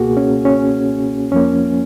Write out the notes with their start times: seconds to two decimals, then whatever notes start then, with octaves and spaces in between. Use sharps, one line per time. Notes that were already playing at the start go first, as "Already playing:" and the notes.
Already playing: C#2 B2 A#3 F#4 G#4
0.17 C#4
0.45 C#4
1.32 F2 F3 A#3 C#4